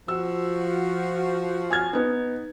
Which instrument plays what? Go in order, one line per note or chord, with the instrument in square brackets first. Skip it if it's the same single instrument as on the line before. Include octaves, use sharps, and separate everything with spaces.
[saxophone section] F3 F#4 [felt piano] E6
[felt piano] G#5 F6 G#6
B3 D#4